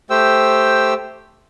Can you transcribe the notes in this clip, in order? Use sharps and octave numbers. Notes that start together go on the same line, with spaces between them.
A3 G4 C5 G5 E6